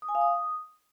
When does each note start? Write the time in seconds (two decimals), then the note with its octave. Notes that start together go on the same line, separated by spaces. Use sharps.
0.02 D#6
0.09 G#5
0.15 F5
0.21 D#6